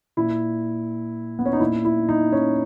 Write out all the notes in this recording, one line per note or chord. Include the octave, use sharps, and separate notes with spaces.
A#2 E4
B3
C#4
D#4
A#2 E4
E4
D#4
C#4